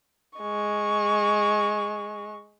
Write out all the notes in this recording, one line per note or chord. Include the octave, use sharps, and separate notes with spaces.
G#3 C#6